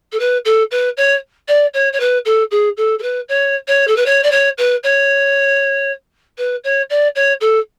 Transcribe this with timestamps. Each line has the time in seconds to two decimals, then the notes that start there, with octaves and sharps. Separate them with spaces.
0.12 A4
0.19 B4
0.45 A4
0.71 B4
0.97 C#5
1.48 D5
1.74 C#5
1.93 C#5
2.00 B4
2.25 A4
2.51 G#4
2.77 A4
2.99 A4
3.02 B4
3.28 C#5
3.67 C#5
3.87 A4
3.96 B4
4.06 C#5
4.23 D5
4.31 C#5
4.58 B4
4.83 C#5
6.38 B4
6.64 C#5
6.90 D5
7.15 C#5
7.41 A4